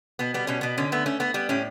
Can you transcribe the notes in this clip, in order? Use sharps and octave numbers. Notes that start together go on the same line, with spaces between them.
B2 B3
G3 B3
B2 C#4
B2 B3
D3 C#4
A3 B3
A3 C#4
A3 B3
G3 B3
A2 C#4